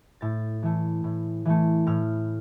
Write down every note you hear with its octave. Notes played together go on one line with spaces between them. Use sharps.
A2 A6
E3 A3
A2
E3 A3
A2 F6